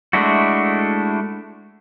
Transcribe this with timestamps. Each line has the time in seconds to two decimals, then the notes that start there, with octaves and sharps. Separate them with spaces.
0.13 G#3 A3 D4 E4 F#4